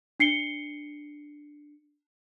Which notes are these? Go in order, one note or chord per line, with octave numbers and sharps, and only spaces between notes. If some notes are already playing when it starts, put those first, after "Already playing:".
D4 C7 C#7 G7